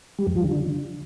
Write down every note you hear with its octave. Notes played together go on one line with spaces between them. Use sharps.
G3
F2
F3
D3